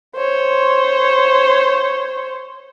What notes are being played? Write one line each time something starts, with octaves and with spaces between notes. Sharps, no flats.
C5 C#5